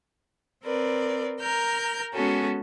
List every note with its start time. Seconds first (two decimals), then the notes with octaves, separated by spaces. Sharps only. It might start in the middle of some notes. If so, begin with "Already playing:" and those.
0.63 C4 A#4 B4 D5
1.41 A#4 A#5 F6 G6
2.13 G#3 B3 C#4 F#4 G#4 A4